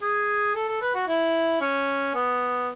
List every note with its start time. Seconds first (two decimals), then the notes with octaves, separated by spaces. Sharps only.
0.01 G#4
0.55 A4
0.68 A4
0.81 B4
0.94 F#4
1.08 E4
1.61 C#4
2.14 B3